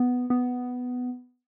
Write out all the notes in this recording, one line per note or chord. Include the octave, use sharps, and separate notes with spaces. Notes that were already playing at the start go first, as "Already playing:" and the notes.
Already playing: B3
B3